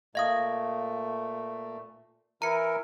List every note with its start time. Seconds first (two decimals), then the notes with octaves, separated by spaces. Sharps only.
0.15 A#2 A3 D#5 F5 D#6
2.42 E3 E4 A#4 A#5 C#7